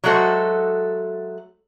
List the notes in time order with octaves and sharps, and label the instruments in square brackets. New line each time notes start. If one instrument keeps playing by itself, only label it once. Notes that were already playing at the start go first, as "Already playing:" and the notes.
[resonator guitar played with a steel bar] F#3 G#3 A3 F#4 A4 C5